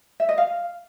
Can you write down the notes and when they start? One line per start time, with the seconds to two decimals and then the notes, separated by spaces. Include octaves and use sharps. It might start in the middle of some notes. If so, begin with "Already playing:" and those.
0.20 E5
0.29 D#5
0.38 F5